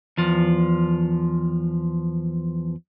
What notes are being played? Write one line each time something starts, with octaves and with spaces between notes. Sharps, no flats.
E2 F3